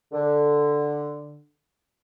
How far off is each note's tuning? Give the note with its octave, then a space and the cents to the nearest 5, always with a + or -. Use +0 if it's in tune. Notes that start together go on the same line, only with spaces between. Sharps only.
D3 +5